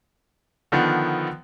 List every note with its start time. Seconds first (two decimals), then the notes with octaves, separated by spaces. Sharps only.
0.72 D3 D#3 F3 B3